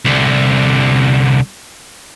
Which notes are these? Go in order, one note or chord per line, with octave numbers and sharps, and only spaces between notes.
C2 D3